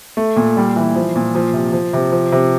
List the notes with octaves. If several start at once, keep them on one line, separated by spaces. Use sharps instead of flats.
A3
A#2
G3
E3
F3
A#2
F3
C3
F3
C3
F3
C3